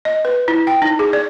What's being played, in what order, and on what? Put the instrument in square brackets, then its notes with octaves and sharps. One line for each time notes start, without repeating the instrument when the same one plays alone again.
[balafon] D#5
B4
E4
G5
D#4
G#4
D5